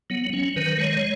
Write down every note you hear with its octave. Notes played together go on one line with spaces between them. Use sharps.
F#3 B3
F#3 C#4
D#3 B4
G#3 C#5